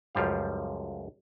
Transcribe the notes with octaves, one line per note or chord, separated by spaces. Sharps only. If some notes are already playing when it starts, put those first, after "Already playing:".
C#2 F#2 F3 G3 F5